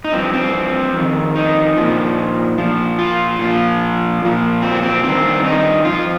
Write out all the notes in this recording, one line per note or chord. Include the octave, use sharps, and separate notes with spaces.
D#4
G2 F3 C4
C4
F2 D#3
D#4
A#2 F3
A#2 F3
F4
A#2 F3
A#2 F3
C4
C4
G2 D#3 C4
D#4
F2 F3 F4